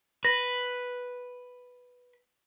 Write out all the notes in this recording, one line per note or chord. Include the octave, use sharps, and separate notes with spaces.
B4 A#6